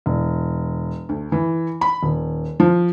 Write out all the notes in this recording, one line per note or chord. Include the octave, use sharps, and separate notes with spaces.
E1
D2
E3
B5
D#1
F3